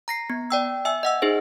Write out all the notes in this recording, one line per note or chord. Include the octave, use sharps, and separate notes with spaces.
A#5 A#6 C7
B3
D5 G5 E6
E5 G#5 E6
D#5 F#5 E6
D#4 G#4 C5